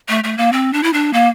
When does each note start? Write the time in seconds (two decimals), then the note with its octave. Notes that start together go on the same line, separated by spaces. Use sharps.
0.09 A3
0.24 A3
0.38 A#3
0.52 C4
0.73 D4
0.83 E4
0.93 D4
1.13 A#3